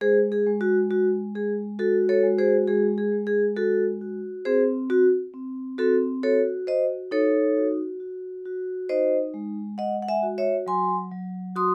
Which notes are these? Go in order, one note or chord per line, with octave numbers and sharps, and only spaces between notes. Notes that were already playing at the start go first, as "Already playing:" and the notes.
G#3 G#4 C5
G#4
G#3
F#4
F#4
G#3 G#4
F#4 A4
A4 C#5
G#3
G#4 C5
G#3 G#4
G#4
G#3
G#4
F#4 A4
F#4
C4 G#4 C5
F#4
C4
C4 F#4 A4
F#4 A4 C#5
F#4 C5 D#5
D#4 A4 C#5
F#4
F#4
F#4
D#4 C5 D#5
G#3
G#3 D#5 F#5
F#5
E5 G#5
F#4
C#5 E5
F#3 G#5 C6
F#3
F#4 C6 D#6